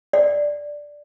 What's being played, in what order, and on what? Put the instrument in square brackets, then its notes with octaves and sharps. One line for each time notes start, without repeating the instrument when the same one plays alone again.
[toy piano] D5